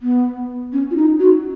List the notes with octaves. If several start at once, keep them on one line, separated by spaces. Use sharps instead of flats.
B3
C#4
F4
D#4
F#4